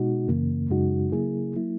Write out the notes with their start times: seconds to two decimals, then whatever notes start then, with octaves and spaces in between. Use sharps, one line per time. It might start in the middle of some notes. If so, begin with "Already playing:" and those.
Already playing: B2 G#3 D#4 F#4
0.28 F#2 C#3 E3 A#3
0.70 F#2 C#3 G#3 D#4 F#4
1.12 C#3 F#3 A#3 E4 G#4
1.55 F#3 A#3 E4